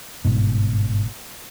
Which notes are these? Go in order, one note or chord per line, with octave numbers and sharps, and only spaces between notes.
G1 G#2 B2